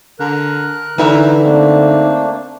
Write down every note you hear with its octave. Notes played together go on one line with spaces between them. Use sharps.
D3 A#4 F#6
D3 E3 D#4 E5 A#5
A3 A#3 C4 D4